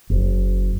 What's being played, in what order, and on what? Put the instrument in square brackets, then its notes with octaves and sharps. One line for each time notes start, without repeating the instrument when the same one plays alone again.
[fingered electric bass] F#1